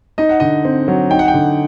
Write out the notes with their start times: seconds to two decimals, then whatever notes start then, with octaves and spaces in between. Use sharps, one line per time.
0.18 D#4 D#5
0.29 F#5
0.40 D3 D#5
0.65 C4
0.88 F#3
1.10 D#4 G5
1.19 F#5
1.28 G5
1.34 D3